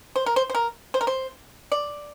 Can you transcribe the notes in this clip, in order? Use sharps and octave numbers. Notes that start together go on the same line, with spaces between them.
C5
A#4
C5
C5
A#4
C5
A#4
C5
D5